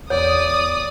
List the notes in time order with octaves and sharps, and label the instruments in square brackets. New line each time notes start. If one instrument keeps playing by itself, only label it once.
[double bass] E2 [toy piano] C#5 [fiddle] D5 [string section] D#6